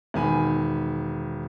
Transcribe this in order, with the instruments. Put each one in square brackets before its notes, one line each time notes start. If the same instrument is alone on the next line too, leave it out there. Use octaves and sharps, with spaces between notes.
[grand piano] E1 D#3 G#5 B5